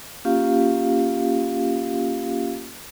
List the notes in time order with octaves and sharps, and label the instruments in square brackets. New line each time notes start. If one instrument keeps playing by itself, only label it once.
[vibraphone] A#3 C#4 F4 G4 F5